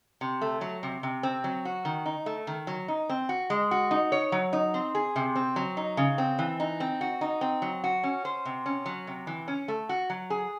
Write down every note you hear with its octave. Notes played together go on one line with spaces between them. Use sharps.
C3
A3
F#3
C3
C3
C4
F#3
F#4
D#3
D#4
A3
D#3
F#3
D#4
C4
F#4
G#3
F#4
D#4
C#5
F#3
D#4
C4
G#4
C3
C4
F#3
D#4
C#3
C4
E3
D#4
C4
F#4
D#4
C4
F#3
F#4
C#4
C5
C3
C#4
F#3
C3
E3
C#4
A3
F#4
F#3
G#4